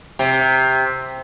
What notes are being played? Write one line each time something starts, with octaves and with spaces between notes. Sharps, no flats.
C3